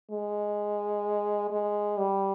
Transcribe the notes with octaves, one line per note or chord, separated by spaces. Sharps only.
G#3
G#3
G3